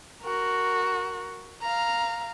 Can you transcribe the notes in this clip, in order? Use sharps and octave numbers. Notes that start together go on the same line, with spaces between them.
F#4 A#4
F5 A#5